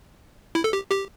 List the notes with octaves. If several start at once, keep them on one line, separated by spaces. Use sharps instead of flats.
E4
A4
G4
G4